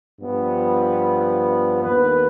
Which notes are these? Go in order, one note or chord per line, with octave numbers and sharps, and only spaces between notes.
G2 F3 B3
D#2 D#3 B3 B4